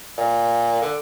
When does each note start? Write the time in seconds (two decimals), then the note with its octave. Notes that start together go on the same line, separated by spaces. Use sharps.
0.18 A#2
0.82 D3